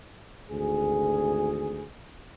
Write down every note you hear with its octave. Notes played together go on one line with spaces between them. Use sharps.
G#1 D2 G#4